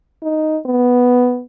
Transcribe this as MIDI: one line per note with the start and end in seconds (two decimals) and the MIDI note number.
0.23 0.59 63
0.66 1.42 59